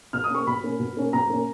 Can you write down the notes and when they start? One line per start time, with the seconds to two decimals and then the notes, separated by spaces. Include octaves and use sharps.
0.13 B2 F6
0.24 D#6
0.30 A#3 C#4 C#6
0.47 B2 B5
0.64 A#3 C#4
0.79 B2
0.97 A#3 C#4
1.13 B2 A#5
1.30 A#3 C#4